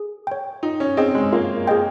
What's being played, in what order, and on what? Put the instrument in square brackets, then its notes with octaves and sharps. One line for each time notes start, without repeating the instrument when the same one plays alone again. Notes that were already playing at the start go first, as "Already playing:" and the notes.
Already playing: [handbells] G#4
C#5 G5
[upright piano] D#4 [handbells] F4
[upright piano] C#4
[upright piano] C4 [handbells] G#4 D#5 G5
[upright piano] G#3
[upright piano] A#3 [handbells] F4
[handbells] G#4 D#5 G5